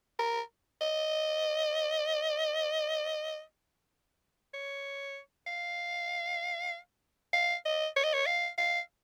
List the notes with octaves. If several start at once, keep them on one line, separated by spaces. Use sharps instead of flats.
A#4
D#5
C#5
F5
F5
D#5
C#5
D#5
C#5
F5
F5